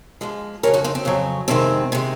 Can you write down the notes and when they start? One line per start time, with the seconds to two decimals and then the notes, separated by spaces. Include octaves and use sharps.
0.21 G#2 F3 G#3
0.63 F2 C#3 F#3 A#4 C#5
0.74 D#4 F#4
0.84 C4 D#4
0.95 C4
1.05 F2 C#3 F#3
1.48 F2 C3 D#3 G#3 C4
1.92 C3 D#3 G#3